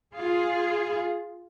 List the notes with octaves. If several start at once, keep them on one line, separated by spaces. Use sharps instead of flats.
F4 G#4